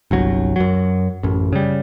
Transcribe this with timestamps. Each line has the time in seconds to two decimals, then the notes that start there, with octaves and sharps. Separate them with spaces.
0.11 G1 C2 F#3
0.56 F#2 F#3
1.23 A1 F#2
1.53 C#3 G3